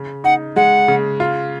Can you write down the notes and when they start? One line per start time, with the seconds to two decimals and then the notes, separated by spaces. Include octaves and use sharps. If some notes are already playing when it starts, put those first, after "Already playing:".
Already playing: C#3
0.24 D#4 F#5
0.56 G#3 F#5
0.88 C#3
1.20 F4